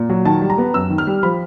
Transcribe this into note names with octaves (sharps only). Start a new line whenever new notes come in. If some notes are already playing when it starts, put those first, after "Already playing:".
Already playing: A#2
F#3
D#3 A5
G3
A#5
B3
F#2 E6
D#3
F6
G3
F3 B5